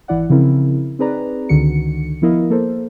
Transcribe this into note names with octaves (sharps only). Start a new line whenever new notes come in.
G#1 E3 E4 D5 F#5
C#3 F3 C4 E4 A#4
C4 D#4 G#4 B4 D5 A#5
C#2 D3 D#3 F#4 C#7
F3 B3 E4 A#4 D#5 F5
A#3 A4 A#4 C5